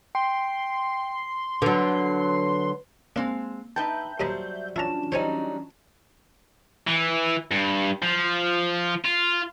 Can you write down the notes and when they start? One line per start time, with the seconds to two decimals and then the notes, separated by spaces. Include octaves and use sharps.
0.15 G5 C6
1.62 D3 F#3 B4
3.16 G#3 A#3 C4 D4 F5
3.76 D#4 B4 E5 G5 A5 G6
4.20 D#2 F#3 G3 C5 D#5 B5
4.76 E3 C#4 D4 E4 F4 A5 A#5 E7
5.12 F#3 G3 D#4 C5 C#5 G#5
6.87 E3
7.52 G2
8.03 F3
9.05 F4